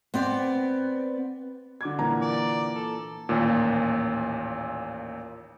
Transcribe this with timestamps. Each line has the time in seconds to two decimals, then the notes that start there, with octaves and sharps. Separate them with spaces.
0.14 B3 C4 D5
1.81 D3 D6 G#6
1.99 A#2 E3 A#5
2.22 D5
2.75 A4
3.29 A1 D#2 A#2